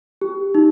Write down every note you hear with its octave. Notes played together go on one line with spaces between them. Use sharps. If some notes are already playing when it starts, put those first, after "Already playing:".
G4
D#4